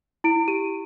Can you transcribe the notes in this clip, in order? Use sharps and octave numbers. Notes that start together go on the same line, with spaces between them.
E4 D7
G4 D#7